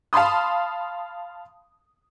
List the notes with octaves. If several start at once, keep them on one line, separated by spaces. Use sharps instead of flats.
F5 A5 B5 C6 D#6